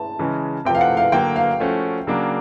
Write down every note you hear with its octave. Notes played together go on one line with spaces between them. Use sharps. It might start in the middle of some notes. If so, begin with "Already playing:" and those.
Already playing: A5
C#3 E3 G#3 C#4
C3 F3 A3 G5
F5
F#5
F5
D3 F#3 A#3 G5
F5
F3 A3 C#4 F#4
C#3 F#3 A#3 D4